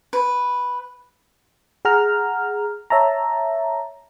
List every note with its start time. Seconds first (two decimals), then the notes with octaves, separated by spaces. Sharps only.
0.13 B4
1.85 G#4 F#5 A#5 F6
2.90 C#5 E5 A5 A#5